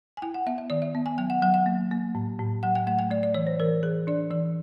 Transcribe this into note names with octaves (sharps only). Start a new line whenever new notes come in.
G#5
E4 G5
F#5
B3 E5
E5
D#3 D5
E5
B3
G#5
F#3 G5
F#5
F#3 F#5
F#5
A#3
A#3
A2
A2
F#3 F#5
G5
A3 F#5
G5
A3 D5
D5
E3 C#5
C5
E3 A#4
E3 G#4
D4 D5
E3 D5